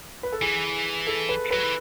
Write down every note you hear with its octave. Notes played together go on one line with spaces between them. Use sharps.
B4
A4
E3 G#4
A4
B4
F#3 B4
E3